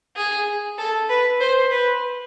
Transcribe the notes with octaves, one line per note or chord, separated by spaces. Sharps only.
G#4
A4
B4
C5
B4